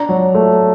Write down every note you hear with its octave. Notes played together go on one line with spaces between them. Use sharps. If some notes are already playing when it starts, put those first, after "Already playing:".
Already playing: D4 A#5
F#3
A3